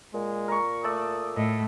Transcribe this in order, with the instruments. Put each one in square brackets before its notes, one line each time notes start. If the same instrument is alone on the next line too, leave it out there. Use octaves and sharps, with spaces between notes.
[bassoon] A#2 [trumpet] G#3
[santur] A#4 C#6
[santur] A3 D5 E6 [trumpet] D#6
[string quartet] A2 [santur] D#5